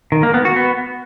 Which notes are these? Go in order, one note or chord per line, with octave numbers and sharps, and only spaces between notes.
D#3
A#3
B3
F#4
B3